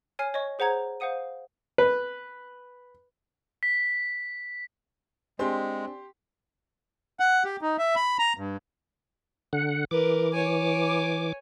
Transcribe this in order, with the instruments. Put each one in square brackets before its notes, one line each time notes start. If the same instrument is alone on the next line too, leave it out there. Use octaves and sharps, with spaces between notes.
[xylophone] C#5 G#5 F6 C7
C#5 D#5 C#6
G#4 C5 F#5 A#5 G#6
C5 F5 F#5 D#6 D#7
[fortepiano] B4
[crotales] B6
[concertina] G#3 [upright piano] C4 [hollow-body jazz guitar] D4 G#4 [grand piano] G4 C6
[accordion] F#5
G4
D#4
E5
B5
A#5
G2
[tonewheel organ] D3 F#5
[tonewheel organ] E3 D6 [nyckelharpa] A#4 B4
[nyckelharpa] C#5 G#5